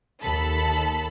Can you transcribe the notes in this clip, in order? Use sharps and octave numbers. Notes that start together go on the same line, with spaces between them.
D#2 A4 A5 B5